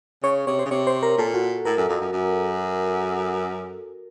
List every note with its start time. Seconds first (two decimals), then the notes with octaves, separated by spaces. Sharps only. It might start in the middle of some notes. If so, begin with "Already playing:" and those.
0.23 C#3 C#5
0.47 C3 C#5
0.59 C5
0.66 C#3
0.71 C3 C#5
0.87 C5
1.03 A#4
1.18 A#2 A4
1.34 F#4
1.65 A2 A#4
1.77 F#2
1.89 F2
2.01 F#2
2.13 F#2